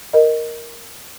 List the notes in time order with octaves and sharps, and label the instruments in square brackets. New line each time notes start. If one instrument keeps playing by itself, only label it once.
[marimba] A#4 D#5